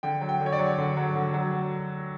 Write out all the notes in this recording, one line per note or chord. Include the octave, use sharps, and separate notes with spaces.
D3 G5
F#3
G5
D3
C#5
D5
F#3
D3
F#3
D3
F#3